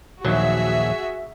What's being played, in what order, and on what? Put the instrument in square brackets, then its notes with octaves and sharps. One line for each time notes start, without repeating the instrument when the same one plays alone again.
[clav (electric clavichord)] A#1 D#2 F#3 [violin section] F#4 G#4 E5